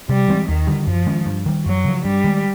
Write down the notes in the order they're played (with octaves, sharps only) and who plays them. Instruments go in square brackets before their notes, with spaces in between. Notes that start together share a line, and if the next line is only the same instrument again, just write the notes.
[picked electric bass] C3 [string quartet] G3
[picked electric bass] E3 G#3 C4
[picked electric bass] D#2 [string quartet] D#3
[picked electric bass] D3 G3
[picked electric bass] F#2 [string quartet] F3
[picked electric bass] D#3 G#3 C#4
G2
D#3 G3
[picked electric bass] F#2 [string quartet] F#3
[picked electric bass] C#3 F3
[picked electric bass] G2 [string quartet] G3
[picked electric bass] D#3 G#3